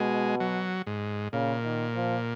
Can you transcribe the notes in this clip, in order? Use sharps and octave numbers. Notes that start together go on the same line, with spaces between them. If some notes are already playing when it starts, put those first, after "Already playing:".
Already playing: B2 G#3
F#3
G#2
A#2 C#3
D#3
F3